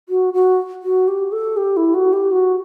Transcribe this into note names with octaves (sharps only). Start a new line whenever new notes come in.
F#4
F#4
F#4
G4
A4
G4
E4
F#4
G4
F#4